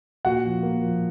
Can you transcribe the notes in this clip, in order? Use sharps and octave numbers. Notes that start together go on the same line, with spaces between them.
A#2 F#4 F#5
F3
A#3
F3